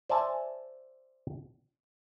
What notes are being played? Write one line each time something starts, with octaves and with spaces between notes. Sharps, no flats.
C5 D5 E5 G#5 A5